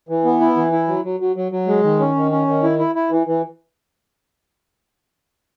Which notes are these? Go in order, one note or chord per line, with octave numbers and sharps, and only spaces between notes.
E3
B3
E4
E3
E4
F#3
F#3
F#3
F#3
F#3
G#3
D#3
C#4
D#3
C#4
D#3
E4
E4
E4
E3
E3